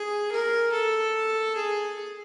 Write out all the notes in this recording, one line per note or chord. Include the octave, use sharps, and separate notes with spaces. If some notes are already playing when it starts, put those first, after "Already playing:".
Already playing: G#4
A#4
A4
G#4